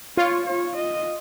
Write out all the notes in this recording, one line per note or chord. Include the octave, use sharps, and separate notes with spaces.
F4 C#5
C#5
D#5